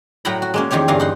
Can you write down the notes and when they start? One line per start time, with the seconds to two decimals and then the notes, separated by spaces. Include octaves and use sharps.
0.25 A2 F#3 F#5 G5 A#5 B5
0.42 F#4
0.54 G#3 A#3 C#4
0.71 E2 D#3 F3 G4 C#5
0.88 E2 G2 D3 E3 F5 A#5
1.00 D#4 F#5 C6